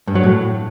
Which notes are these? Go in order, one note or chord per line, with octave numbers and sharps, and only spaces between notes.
G2
F#3
A2